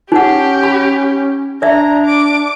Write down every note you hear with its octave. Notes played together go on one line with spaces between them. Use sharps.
C#4 D#4 G4 F#5
B5
D4 D5 E5 A#5
D6